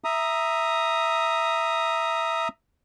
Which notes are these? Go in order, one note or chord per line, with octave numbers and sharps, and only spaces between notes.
E5 A#5 D#6